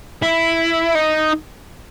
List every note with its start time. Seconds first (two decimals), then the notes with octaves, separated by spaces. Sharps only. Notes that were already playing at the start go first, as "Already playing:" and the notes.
0.22 E4
0.95 D#4